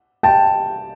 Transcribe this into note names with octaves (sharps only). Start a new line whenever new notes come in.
G5 A5